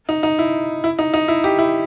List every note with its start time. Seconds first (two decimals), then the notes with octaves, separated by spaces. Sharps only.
0.09 D#4
0.23 D#4
0.39 E4
0.84 E4
0.99 D#4
1.14 D#4
1.28 E4
1.44 G4
1.59 E4